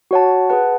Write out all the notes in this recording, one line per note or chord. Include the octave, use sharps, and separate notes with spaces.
F#4 C#5 F#5 A5
G#4 B4 F#5 A5